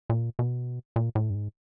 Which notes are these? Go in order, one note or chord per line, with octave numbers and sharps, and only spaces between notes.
A#2
B2
A#2
A2
G2
G#2